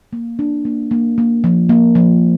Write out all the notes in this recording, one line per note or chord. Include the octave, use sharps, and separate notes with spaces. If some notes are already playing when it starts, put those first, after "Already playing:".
A#3
D4
A#3
A#3
A#3
F3
A#3
F3